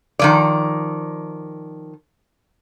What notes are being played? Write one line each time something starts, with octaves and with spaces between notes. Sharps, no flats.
D#3 F3 D5